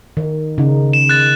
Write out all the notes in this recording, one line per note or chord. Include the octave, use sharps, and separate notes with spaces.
D#3
C#3 D#4
E7
F#6 A6